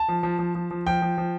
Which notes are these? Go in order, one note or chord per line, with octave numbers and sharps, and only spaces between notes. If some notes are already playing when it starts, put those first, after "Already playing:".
Already playing: A5
F3
F3
F3
F3
F3
F3 G5
F3
F3